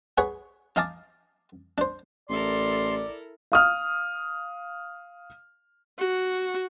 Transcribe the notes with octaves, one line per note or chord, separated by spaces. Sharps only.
G#4 B4 C#5 F#5 G#5
D#4 D#5 F5 G#5 A5 D6
D4 C5
A1 E4 A4 A#4 D5 C6
F5 D#6 F6
F#4